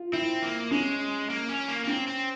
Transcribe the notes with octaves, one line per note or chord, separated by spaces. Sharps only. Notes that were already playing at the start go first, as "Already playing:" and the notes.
Already playing: F4
C4 E4
A#3
G#3 C#4
A#3
C#4
A#3
A#3
C4 C#4
C4